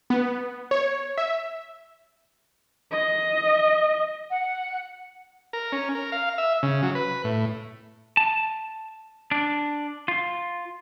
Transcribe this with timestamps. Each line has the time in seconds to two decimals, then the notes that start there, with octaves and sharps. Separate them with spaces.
0.10 B3
0.71 C#5
1.18 E5
2.91 D#5
4.30 F#5
5.53 A#4
5.72 C#4
5.95 A#4
6.12 F5
6.38 E5
6.63 C#3
6.83 F#3
6.95 B4
7.24 A2
8.17 A5
9.31 D4
10.08 F4